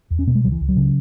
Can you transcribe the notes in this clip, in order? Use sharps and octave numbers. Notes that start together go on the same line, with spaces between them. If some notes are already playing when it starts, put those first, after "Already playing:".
E2
C#4
B2 B3
G#3
C#2 F#3
E3
C#2
F#3
C#3